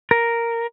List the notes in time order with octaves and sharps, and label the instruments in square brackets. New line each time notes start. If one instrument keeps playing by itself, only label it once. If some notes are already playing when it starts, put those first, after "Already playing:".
[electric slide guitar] A#4